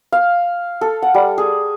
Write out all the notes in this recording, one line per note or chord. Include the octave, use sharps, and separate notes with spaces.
F5
A4
F#5
G3
G#4